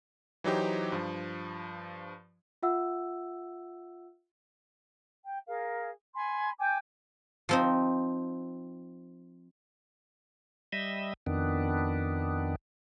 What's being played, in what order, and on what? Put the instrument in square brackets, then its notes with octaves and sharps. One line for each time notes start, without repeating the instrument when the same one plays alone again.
[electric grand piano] E3 F#3 D#4 G4 C5
G2 F3
[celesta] F4 E5 F#5 E6
[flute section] G5
G#4 A#4 F5
G#5 B5 C6
G5 G#5 D6 G6
[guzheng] F3 C4 D#4
[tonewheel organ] G3 D#5 E5
F2 D#3 B3 D4